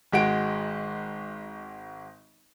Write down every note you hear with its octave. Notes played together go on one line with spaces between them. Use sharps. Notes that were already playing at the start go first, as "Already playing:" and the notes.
G#1 G#3 F#4 D7